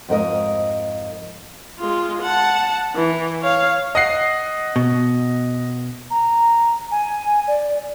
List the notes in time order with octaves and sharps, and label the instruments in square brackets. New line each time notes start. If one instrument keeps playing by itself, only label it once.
[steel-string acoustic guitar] F2 G#2 A#4 D#5
[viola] G#3 F4
F#5 A5
E3
C#5 F5
[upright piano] D#5 F#5 C7
[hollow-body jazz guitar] B2
[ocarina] A#5
G#5
D5